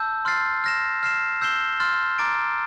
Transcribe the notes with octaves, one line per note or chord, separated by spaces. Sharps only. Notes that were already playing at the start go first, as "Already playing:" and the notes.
Already playing: A5 E6 G6
C6 F6 A6 C7
F6 A#6 E7
F6 C7 E7
E6 G6 C7 E7 G7
C6 F6 A6
A#5 D6 A6 D7